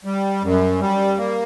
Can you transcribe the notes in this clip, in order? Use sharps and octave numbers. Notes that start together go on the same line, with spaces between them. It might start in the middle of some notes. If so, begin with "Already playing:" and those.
G3
F#2
G3
A#3